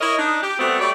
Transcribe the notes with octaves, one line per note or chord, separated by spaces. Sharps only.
E4 A#4 C#5 D#5
D4 D#4
G4
G3 A3 B3 C4 F#4
G3 A3 C#5 D5